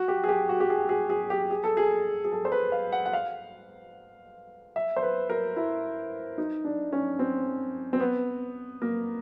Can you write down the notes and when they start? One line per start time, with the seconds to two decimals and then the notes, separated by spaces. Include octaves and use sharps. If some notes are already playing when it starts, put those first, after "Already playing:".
Already playing: F#4
0.08 G4
0.24 G#4
0.29 G4
0.49 F#4
0.60 G4
0.70 G#4
0.89 G#4
1.10 G#4
1.30 G4
1.51 G#4
1.64 A4
1.77 G#4
2.24 G#4
2.32 A4
2.45 C5
2.52 B4
2.72 F5
2.92 F#5
3.06 F#5
3.13 F5
4.76 E5
4.96 C5
5.03 B4
5.30 A#4
5.56 E4
6.38 D#4
6.64 D4
6.93 C#4
7.19 C4
7.93 C4
8.00 B3
8.82 A#3